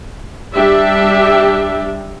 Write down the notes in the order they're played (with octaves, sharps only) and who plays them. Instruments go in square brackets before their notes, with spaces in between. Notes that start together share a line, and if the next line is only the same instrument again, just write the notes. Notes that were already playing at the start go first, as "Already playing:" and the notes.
[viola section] G3 D4 G4 E5